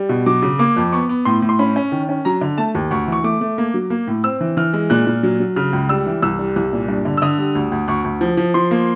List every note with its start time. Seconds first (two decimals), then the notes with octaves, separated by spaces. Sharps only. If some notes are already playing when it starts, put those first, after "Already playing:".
Already playing: G3
0.09 B2
0.26 F#3 D6
0.42 C#3
0.59 A#3 D6
0.77 F2
0.93 B3 C#6
1.09 B3
1.25 A2 C6
1.42 A2
1.49 C6
1.59 C#4 B5
1.76 C#4
1.92 D#3
2.09 C#4
2.25 F#3 A#5
2.41 D3
2.58 A3 A5
2.75 D#2
2.91 D2 C#6
3.08 E3 C#6
3.24 A3 D6
3.41 A3
3.58 A#3
3.74 F#3
3.90 A#3
4.07 A2
4.24 C4 E6
4.41 E3
4.57 E3 F6
4.74 G#3
4.90 A#2 F#6
5.07 A#2
5.23 F#3
5.40 F#3
5.56 C#3 F6
5.73 C#2
5.89 G3 E6
6.06 E3
6.22 C2 E6
6.39 G3
6.56 C2
6.73 A#2
6.88 G2
7.05 D3
7.17 E6
7.22 D3 D#6
7.38 G3
7.55 D2
7.72 D2
7.88 D2 C#6
8.04 D2
8.21 F3
8.37 F3
8.54 F3 C6
8.71 A#3